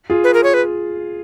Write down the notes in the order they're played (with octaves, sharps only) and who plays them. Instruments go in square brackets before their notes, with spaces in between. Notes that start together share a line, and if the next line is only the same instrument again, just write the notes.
[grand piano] F4 G#4
[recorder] B4
A#4
C#5
B4